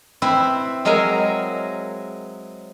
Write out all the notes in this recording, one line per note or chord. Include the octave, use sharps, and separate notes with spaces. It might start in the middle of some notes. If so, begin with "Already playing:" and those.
C4 E4 B4
F#3 G#3 E4 A#4 G#5